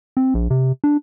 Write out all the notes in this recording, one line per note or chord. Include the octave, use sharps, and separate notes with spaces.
C4
A#1
C3
D4